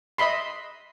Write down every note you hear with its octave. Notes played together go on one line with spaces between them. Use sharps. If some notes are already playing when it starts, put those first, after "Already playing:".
D#5 E5 B5 C6